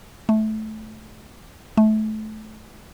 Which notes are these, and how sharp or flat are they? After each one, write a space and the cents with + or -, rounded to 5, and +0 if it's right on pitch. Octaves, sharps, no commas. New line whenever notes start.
A3 -15
A3 -25